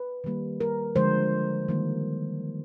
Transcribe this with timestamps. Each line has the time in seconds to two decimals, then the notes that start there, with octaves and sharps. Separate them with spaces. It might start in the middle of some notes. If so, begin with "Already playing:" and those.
Already playing: B4
0.24 D#3 G3 A#3
0.60 A#4
0.95 D3 F3 G#3 C5
1.68 D#3 G3 A#3